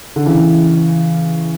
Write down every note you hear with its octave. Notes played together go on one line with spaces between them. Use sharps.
D3
C#3 E3